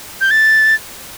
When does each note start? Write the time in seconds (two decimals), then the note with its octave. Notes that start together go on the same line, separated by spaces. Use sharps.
0.21 G6
0.31 A6